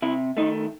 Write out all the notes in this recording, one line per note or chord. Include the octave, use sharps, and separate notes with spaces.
C3 E4
D#3 A3 D#4